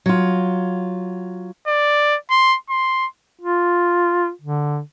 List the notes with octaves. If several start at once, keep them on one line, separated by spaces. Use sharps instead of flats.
F#3 F4
D5
C6
C6
F4
D3